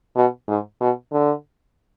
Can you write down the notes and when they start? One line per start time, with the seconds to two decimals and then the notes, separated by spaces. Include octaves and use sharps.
0.16 B2
0.48 G#2
0.81 B2
1.12 D3